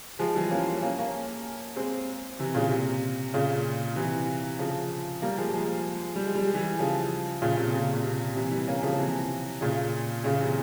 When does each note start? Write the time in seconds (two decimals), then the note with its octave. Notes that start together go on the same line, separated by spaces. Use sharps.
0.19 F3 G#3
0.35 E3 G3
0.51 A#3 C#4
0.82 A#3 C#4
0.99 A#3 C#4
1.76 G#3 C4
2.39 C3 E3
2.55 A#2 C#3
2.71 C3
3.34 A#2 C#3
3.96 C3 E3
4.59 C#3 F3
5.22 G3 A#3
5.38 F3 G#3
5.53 F3 G#3
6.16 G3
6.26 G#3
6.35 G3
6.44 G#3
6.54 E3 G3
6.79 C#3 F3
7.42 A#2 C#3
7.57 C3
7.73 C#3
7.84 C3
7.94 A#2
8.03 C3
8.35 C3 E3
8.51 E3 G3
8.68 A#3 C#4
8.83 C#3 F3
8.99 C3 E3
9.61 A#2 C#3
10.24 A#2 C#3
10.40 C3 E3